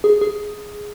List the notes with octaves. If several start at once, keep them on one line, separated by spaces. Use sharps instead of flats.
G#4
G#4